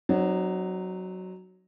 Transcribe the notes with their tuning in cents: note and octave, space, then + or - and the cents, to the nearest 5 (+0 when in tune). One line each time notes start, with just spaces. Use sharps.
F#3 +5 C4 +0 D#4 -35